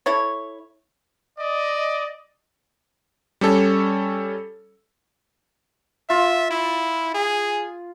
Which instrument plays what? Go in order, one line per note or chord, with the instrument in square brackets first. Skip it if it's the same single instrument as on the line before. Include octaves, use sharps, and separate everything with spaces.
[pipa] E4 A4 C#5
[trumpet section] D5 D#5
[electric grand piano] G3 C#4 A4 C#5
[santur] F4 [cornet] E5
[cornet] E4
G#4